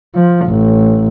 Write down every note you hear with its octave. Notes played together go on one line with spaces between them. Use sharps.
F3
A1